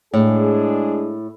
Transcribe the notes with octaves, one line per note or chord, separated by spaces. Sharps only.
A2 G#3 D4 G#4